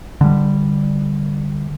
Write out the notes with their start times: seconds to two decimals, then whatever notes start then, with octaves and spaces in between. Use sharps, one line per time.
0.21 D3 G3